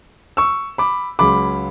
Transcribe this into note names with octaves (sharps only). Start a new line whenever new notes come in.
C#6 E6
B5 D6
C#2 C#3 F#3 B5 D6